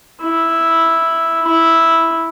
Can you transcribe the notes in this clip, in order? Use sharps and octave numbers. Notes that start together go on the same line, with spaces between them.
E4
E4